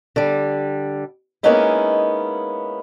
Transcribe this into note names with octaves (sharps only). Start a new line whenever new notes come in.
D3 G3
G#3 A#3 B3 C#4 D#4 E4